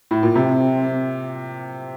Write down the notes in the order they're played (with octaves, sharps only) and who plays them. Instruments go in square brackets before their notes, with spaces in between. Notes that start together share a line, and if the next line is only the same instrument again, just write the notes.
[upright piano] A2
A#2
[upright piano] C3 [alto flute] C4